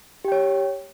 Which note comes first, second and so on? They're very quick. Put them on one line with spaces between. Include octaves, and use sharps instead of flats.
G4 G5 C#5